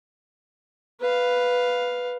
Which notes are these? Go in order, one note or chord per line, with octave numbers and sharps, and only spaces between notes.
B4 F5